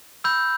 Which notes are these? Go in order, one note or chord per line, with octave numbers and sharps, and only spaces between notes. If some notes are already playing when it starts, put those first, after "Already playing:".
B5 E6 G6